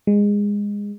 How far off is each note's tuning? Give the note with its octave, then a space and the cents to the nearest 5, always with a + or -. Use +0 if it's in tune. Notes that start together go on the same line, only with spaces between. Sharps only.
G#3 -20